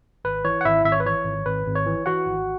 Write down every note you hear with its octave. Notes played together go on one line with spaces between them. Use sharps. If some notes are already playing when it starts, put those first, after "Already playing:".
G#1 B4
E3 C#5
F#5
G#1 E4 E5
G#1 E5
C#5
B4
E3 C#5
G#1
G#1 B4
G#1
C#5
E3
E3 F#4 F#5
G#1